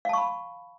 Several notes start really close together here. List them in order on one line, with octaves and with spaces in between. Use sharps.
F5 A5 C#6 B5